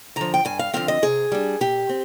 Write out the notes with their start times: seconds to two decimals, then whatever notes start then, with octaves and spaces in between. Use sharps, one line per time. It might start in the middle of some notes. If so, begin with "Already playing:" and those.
0.16 D3 F3 A#5
0.34 G5
0.45 G2 G#5
0.59 F5
0.74 D3 F3 C4 F5
0.88 D#5
1.02 C3 G#4
1.32 G3 D4
1.61 A#2 G4
1.89 C4